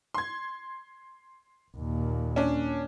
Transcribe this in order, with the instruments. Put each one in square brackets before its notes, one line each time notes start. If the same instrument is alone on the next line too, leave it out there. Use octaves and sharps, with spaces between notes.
[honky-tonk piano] C6 G#6
[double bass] D#2 A#2
[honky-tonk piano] C#4 D4